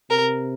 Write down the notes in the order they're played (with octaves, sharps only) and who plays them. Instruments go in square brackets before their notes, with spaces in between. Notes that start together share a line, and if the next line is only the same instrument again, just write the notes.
[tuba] C3 [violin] A#4